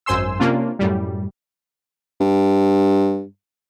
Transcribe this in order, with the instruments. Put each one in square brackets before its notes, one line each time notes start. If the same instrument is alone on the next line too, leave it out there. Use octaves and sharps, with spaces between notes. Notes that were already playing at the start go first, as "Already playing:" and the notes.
[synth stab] G#1 F#2 C5 G#5 C6 E6
C3 A#3 C#4 D4 F4
F#2 A2 G3
[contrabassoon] G2